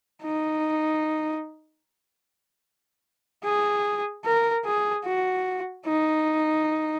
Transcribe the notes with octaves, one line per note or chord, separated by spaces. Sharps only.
D#4
G#4
A#4
G#4
F#4
D#4